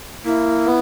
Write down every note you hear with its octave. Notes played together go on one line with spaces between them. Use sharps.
A#3 E4
B3